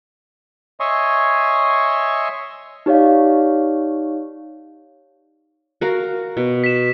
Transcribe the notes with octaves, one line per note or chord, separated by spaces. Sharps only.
C#5 D#5 E5 G#5 C6 C#6
D#4 G4 C#5 D5 F5
F#4 A#4 F5
B2
B6 E7